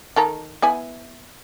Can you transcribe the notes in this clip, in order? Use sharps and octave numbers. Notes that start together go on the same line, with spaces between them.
D#3 A4 A#5
B3 E4 G#5